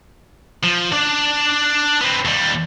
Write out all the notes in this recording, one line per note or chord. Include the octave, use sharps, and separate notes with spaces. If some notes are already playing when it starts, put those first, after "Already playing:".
F3
D4 D5
B3 C4
D#2 G3